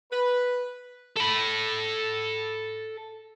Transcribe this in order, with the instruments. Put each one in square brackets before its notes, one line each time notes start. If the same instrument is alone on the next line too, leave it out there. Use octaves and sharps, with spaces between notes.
[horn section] B4
[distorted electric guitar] A4 B5